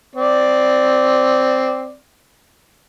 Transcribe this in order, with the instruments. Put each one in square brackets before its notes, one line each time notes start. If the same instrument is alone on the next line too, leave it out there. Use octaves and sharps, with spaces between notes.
[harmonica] C4 D5